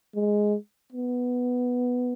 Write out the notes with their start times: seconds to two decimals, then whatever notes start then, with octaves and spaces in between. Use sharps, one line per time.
0.15 G#3
0.92 B3